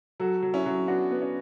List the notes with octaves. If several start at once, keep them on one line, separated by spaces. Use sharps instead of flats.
F#3 F#4 A4
F#3
C#4 E4
F#3
B3 D4 F#4
B3
C#4